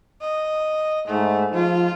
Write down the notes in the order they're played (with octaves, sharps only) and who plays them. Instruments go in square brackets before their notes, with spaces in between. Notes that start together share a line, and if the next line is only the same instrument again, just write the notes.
[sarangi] D#5
[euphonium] G#2 [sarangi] A3
[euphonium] F3 [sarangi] F4